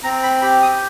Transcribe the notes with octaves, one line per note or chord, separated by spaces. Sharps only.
C4 A#5
B5
G4 B5
D#6